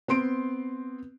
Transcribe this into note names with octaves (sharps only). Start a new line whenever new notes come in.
B3 C4 C6 D7